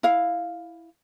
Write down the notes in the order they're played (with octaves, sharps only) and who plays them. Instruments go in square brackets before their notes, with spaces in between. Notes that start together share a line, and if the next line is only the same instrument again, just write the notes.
[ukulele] E4 F5